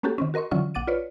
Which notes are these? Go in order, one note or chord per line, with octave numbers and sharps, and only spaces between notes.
A3 A#3 C#4 F#4 G4 A4
D#3 C4 C#4
F#4 A#4 D#5 C6 C#6
D3 E3 F#3 C#4 F4 C#6
A#1 F#5 D6 A6 D#7
F4 B4 C#5 D5